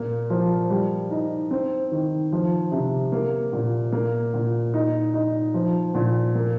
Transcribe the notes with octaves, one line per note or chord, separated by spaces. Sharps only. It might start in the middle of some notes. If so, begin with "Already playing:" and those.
Already playing: A#2 A#3
F3
G3
D#4
C4
D#3
F3
C3
A#3
A#2
A#3
A#2
D#4
D#4
F3
A#2
A#3